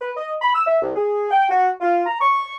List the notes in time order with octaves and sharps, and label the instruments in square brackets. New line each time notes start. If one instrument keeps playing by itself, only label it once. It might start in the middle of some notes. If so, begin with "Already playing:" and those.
[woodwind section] B4
D#5
B5
E6
E5
C2
G#4
G5
F#4
F4
A#5
C#6